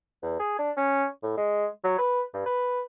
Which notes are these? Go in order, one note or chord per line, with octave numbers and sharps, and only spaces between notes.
E2
G#4
D4
C#4
A2
G#3
F#3
B4
G2
B4